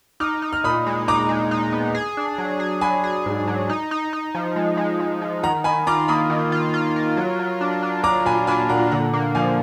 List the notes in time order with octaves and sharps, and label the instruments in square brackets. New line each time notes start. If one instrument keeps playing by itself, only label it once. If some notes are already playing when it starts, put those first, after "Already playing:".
[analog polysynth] D#4 [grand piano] D6 F6
[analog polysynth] D#4
[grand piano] F6
[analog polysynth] A#2 [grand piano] B5 D#6
[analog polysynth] G#3
[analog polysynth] D#4 [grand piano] A#5 D6
[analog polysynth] G#3
D#4
B3
G#4
D4
F#3
G#4
[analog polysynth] F#3 [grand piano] G#5 B5
[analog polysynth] G#4
G#2
F#3
D#4
D#4
D#4
F3
G#3
G#3
G#3
F3
[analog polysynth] D#3 [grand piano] F#5 A#5
[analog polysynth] D#3 [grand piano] G#5 B5
[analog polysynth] F4 [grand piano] A#5 D6
[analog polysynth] A#3 [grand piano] B5 D#6
[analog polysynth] D#3
F4
F4
A#4
F#3
F#3
D4
D4
[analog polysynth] F#3 [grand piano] A#5 D6
[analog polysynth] A#2 [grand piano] G#5 B5
[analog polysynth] D4 [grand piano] G#5 B5
[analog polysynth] A#2 [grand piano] F#5 A#5
[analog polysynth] D3 [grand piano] F#5 A#5
[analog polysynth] A#3
[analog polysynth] F3 [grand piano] F5 G#5